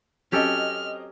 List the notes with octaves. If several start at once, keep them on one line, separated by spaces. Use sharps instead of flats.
F#3 C4 C#4 G4 A4 D#5 F6